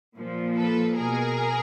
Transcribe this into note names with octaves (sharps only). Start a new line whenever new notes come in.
A#2 F3
A4 B4
B2 G#4 A#4